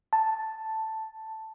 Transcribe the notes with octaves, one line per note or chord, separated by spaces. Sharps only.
A5